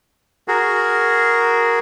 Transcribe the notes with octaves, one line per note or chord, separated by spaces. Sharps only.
F#4 G#4 A#4